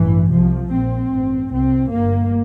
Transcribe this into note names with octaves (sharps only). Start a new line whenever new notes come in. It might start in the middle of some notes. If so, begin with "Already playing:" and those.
Already playing: A1 G2 E3
C2 C3 F3
A#1 A#2 C4
A1 G2
C2 C3 C4
G1 G2 A#3